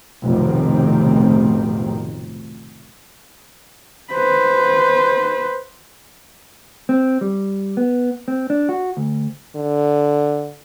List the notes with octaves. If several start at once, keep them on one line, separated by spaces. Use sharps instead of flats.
F1 B1 A2 D#3 C4
B4 C5
C4
G3
B3
C4
D4
F#4
D2
D3